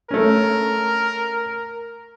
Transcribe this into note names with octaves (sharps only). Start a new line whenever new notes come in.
A3 C#4 A#4